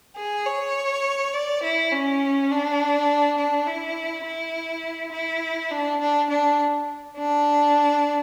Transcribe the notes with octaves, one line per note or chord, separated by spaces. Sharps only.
G#4
C#5
D5
E4
C#4
D4
D4
E4
E4
E4
D4
D4
D4
D4